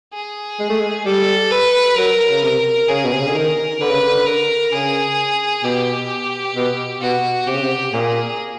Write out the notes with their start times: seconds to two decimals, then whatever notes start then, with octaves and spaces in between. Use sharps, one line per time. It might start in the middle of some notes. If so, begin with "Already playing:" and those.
0.13 G#4
0.59 G#3
0.70 A3
0.80 G#3
1.06 G3 A4
1.51 B4
1.96 F#3 A#4
2.31 C#3
2.43 C3 A#4
2.88 C#3 G#4
3.04 B2
3.12 C3
3.20 C#3
3.27 D3
3.34 D#3 A#4
3.80 D3 B4
3.90 C#3
4.01 D3
4.26 A#4
4.72 C#3 G#4
5.63 B2 G4
6.56 B2
7.01 B2 F#4
7.47 C3 G4
7.54 C#3
7.61 C3
7.93 A#2 G#4